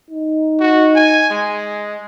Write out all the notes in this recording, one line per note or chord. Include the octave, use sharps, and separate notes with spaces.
D#4
F#4
G#5
G#3